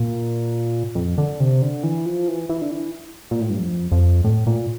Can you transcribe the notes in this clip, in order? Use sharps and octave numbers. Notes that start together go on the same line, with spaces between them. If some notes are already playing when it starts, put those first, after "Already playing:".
Already playing: A#2
F2
D3
C3
D3
E3
F3
E3
E3
D3
E3
A#2
A2
G2
F2
F2
A2
A#2